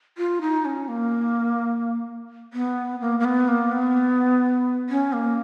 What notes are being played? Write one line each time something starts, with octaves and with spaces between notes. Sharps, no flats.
F4
D#4
C#4
A#3
B3
A#3
A#3
B3
A#3
B3
C#4
A#3